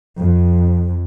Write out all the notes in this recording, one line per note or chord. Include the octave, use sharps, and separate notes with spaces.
F2